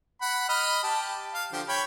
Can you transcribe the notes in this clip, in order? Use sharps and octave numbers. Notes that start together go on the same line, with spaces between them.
F#5 B5
D#5 B5 F6
G4 A5
F5
D3 F3 G4
C#5 G5 B5